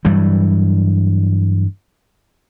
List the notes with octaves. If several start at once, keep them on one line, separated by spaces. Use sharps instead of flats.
G2 E3 F#3 G3